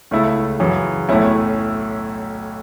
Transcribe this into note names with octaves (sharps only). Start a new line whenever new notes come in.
C#2 C#3 A3 E4 A4
F#2 C#3 E3
B1 A2 A3 C#4 E4